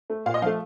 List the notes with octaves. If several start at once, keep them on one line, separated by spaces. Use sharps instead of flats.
A3
A#2 F5
D#5
F3 A3 F5